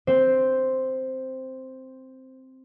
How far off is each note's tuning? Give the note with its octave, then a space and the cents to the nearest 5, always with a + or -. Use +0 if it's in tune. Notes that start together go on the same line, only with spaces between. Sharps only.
C4 +0 C5 +0